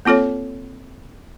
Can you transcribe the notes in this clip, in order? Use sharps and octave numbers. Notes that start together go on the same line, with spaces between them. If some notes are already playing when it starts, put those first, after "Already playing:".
A#3 C4 F4 A4 C#5